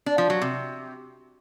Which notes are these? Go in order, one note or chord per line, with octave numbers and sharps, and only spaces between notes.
D4
F3
F#3
C3